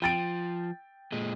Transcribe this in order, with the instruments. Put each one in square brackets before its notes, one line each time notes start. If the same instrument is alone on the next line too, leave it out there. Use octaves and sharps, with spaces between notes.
[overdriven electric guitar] F3 [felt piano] G5 A6 D7
[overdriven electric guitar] A#2 G#3